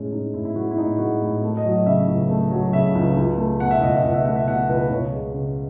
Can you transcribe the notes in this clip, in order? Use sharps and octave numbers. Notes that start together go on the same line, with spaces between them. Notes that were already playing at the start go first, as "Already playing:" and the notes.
Already playing: A2 G#3 C#4
G#3 D#4
A2 E4
E4
G#3 F#4
E4
A2 D#4
G#3 F#4
A2
A3
D#5
F#3
D#5
C#3 E5
C#2
A3
F#3
C#3 E5
C#2
C#2
A3
B2 F#5
E5
C#2 D#5
E5
C#2 F#5
E5
A3 F#5
E5
B2 F#5
C#2 B4
C#2 C#5
G#3
C#3